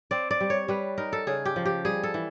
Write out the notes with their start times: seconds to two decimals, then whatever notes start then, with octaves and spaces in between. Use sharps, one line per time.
0.11 C4 D5
0.31 D5
0.40 G3
0.50 C#5
0.68 G3 B4
0.98 D#4 A#4
1.13 A4
1.27 C#3 G#4
1.45 G4
1.56 F3
1.65 G4
1.85 G3 G#4
2.03 A4
2.14 E3